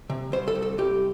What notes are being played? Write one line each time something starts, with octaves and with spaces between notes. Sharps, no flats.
C3
C2 C5
A4
C2
A4
C2 G4